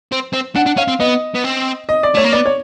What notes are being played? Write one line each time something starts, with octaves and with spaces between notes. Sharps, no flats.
C4
C4
D4 F#5
D4
C#4 F5
C4
B3 D#5
B3
C4
D#5
D5
A3 C#5
A#3
B3 D5
C#5